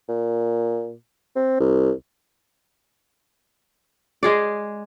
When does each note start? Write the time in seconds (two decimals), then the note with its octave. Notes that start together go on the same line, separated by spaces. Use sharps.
0.09 A#2
1.36 C4
1.60 C2
4.23 G#3 G#4 D5